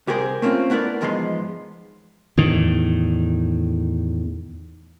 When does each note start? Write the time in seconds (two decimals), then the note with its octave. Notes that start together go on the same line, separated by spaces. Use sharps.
0.07 C2 G4 G#4 A#4 C5
0.42 A3 A#3 C4 C#4 F4
0.70 A3 B3 E4 A#4 D5
1.01 E2 G#2 F3 G#3 B3 C6
2.37 E2 A2 D#3